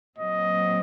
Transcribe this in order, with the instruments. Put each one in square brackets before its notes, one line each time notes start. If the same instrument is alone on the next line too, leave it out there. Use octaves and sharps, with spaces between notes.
[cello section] A#2 F#3 C4 [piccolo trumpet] D#5